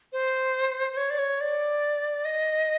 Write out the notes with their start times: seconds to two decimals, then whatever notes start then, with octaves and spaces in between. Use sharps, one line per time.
0.13 C5
0.93 C5
0.97 C#5
1.10 D5
1.18 C#5
1.41 D5
2.25 D#5